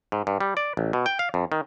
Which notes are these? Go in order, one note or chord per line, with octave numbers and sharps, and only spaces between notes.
G#2
G2
G3
D5
A1
B2
G5
F5
F2
D#3